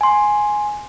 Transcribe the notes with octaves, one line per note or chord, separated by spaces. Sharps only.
G#5 C6